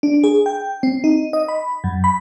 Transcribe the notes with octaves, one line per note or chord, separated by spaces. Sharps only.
D4
G#4
G5
C4
D#4
D#5
B5
F#2
B5